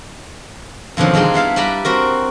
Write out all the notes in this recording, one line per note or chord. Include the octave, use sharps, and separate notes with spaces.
F2 B2 D3 D#3 F3 F#3
G3 G#3 C4 D4 D#4
B3 E4 F5 A5
G3 B4 D5 E5 A#5 B5
C4 F#4 A#4